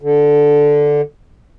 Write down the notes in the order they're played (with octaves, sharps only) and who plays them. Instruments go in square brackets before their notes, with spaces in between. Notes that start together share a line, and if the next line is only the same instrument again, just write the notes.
[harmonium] D3